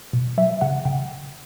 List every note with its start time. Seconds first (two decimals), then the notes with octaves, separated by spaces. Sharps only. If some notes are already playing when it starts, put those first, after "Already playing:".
0.13 B2
0.38 F#3 E5
0.61 C#3 F#5
0.85 C#3 G5